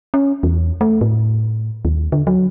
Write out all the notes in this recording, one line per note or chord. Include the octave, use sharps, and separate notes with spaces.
C#4
E2
A3
A2
D#2
D3
F#3